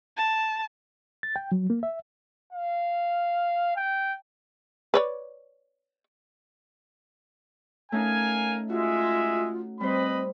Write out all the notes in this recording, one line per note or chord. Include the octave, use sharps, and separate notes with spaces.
A5
A6
G5
F#3
A#3
E5
F5
G5
B4 C#5 D5
A3 C#4 D#4 A#4 F5 G#5
G#3 F4 F#4 E5
G3 C4 B4 C5 D#5 B5